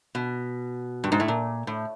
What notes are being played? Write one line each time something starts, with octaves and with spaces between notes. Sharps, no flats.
B2
G2
G#2
A2
A#2
A2